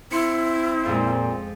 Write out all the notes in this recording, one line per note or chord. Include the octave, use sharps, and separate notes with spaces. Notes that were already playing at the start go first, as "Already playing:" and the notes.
C4 E4 C6 C#7
F2 A#2 G#3